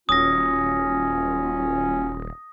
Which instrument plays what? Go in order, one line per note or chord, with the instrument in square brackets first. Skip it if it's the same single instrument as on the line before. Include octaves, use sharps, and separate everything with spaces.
[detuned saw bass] D#1 [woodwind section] F#3 C#4 F4 [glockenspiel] D#6 A#6